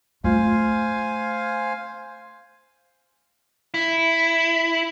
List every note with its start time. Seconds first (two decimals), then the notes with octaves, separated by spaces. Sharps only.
0.24 A3 F4 C5 F5 G#5
3.74 E4